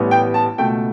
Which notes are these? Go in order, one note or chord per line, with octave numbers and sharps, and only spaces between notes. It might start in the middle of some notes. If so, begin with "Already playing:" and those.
Already playing: A1 A2 G3 B3
G5
A5
C#2 B2 A3 G5